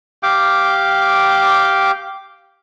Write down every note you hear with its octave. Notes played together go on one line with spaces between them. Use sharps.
G4 F5 G5 D6